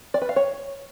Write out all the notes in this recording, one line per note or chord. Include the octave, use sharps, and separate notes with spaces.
D5
B4
F5
C#5